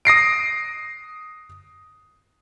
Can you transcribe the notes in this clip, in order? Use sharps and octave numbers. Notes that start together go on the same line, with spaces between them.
D#6 A#6 C7 D7